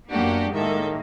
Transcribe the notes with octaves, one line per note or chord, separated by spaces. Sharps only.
F#2 A#3 B3 D4 F#4 G4 F#5
A2 D#3 G#3 A#3 A4 E5